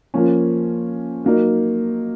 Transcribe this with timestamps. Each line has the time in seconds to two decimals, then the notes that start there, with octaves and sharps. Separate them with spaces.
0.14 F3 A#3 C#4
1.24 F#3 A#3 D#4